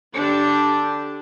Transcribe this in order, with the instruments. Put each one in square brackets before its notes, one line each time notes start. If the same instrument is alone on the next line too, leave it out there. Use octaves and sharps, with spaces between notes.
[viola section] D3 D4 G4